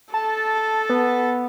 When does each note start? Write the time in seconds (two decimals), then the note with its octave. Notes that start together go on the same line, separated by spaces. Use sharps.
0.14 A4 A5
0.90 B3